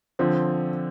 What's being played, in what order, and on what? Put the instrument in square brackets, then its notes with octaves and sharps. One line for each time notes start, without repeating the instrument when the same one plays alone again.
[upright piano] D3 F3 C4